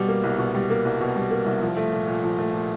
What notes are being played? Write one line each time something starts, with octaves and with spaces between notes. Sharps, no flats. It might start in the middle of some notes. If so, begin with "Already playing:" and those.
Already playing: B2 G3
A#3
C2
B2
G3
A#3
C2
B2
G3
A#3
C2
F3
A3
A#2
A#2
F3
A3
A#2